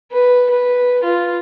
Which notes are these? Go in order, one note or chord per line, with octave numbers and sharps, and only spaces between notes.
B4
B4
F4